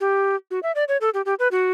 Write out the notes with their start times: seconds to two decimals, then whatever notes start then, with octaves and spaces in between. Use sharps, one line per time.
0.01 G4
0.51 F#4
0.63 E5
0.75 D5
0.88 C#5
1.01 A4
1.14 G4
1.26 G4
1.39 B4
1.52 F#4